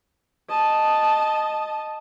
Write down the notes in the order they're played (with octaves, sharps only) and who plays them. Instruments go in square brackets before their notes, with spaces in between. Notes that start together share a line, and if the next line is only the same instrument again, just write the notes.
[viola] D#5 A5